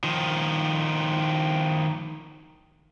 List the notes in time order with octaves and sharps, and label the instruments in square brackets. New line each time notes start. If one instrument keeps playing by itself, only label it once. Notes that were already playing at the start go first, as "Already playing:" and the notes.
[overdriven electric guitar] D#3 F3